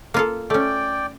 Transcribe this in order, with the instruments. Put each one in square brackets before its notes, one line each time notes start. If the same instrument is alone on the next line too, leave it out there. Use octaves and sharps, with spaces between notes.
[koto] A#3 F4 A4
[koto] A3 C#4 [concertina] D5 G5